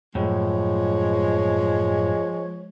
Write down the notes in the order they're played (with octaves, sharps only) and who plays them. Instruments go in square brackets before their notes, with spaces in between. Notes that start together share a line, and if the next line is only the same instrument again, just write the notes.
[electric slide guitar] F#2 A2 [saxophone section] F3 G#3 C#5